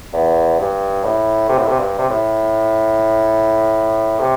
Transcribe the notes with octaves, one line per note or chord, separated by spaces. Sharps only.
E2
G2
A2
C3
A2
C3
G2
C3
A2
C3